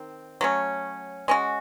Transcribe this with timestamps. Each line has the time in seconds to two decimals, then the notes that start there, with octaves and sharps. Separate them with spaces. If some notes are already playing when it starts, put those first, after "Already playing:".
Already playing: D#3 C4
0.41 F#3 A3 C#4
1.28 G#3 C#4 F#4